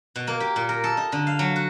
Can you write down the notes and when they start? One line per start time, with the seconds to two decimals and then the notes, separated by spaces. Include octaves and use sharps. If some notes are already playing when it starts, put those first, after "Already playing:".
0.16 B2
0.27 A#3
0.40 G4
0.56 A#2
0.69 A#4
0.84 A4
0.97 D#4
1.12 D3
1.27 F5
1.39 F#3
1.56 F#4